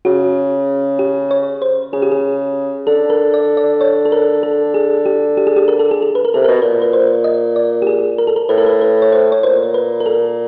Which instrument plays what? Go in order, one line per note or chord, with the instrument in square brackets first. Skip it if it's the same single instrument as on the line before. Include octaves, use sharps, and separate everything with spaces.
[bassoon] C#3 [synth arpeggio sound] F#4
[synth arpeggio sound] G4
C#5
C5
[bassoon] C#3 [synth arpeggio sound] G#4
[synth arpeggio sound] G4
G#4
[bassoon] D3 [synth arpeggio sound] A4
[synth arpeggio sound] A#4
D5
D5
C#5
A4
A#4
A4
G#4
G4
G4
G#4
G4
A#4
A4
G#4
A4
B4
A#4
[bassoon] C3 [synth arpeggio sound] A4
[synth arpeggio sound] A#4
[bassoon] B2
[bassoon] A#2 [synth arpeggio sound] B4
[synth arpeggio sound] B4
C5
D#5
D5
G4
G#4
A#4
A4
A#4
[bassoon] A2 [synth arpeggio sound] B4
[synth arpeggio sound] A#4
B4
B4
C#5
C5
C#5
[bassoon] A#2 [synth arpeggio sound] C5
[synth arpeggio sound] B4
A#4
A4